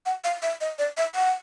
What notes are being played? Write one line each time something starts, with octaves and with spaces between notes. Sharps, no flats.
F#5
F5
E5
D#5
D5
E5
F#5